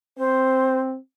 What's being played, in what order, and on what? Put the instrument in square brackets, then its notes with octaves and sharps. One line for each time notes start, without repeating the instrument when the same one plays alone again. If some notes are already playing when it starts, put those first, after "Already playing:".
[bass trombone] C4 [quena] C5